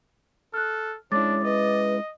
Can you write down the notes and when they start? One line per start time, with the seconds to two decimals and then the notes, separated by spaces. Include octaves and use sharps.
0.54 A4 F6 F#6
1.12 G#3 C#4 D4 E4 C#5 D6 A6
1.44 B4 D#5